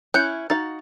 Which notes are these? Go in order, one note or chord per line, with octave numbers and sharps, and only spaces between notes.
C#4 E4 F#6 G6 C#7
D#4 F#4 F5 A6